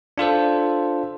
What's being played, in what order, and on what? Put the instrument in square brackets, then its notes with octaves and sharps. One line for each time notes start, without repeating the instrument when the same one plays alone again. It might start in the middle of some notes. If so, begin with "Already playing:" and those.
[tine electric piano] D4 F4 A4 C5